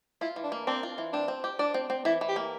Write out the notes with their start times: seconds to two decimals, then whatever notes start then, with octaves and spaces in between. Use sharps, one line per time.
0.21 E4 F4
0.36 E3
0.44 D4
0.52 A#3
0.67 C4 D4
0.83 F4
0.98 E3
1.13 C4 D4
1.28 C4
1.44 G4
1.59 D4 D5
1.74 C4
1.90 C4
2.05 E3 E4
2.21 E3
2.29 G4
2.36 A#3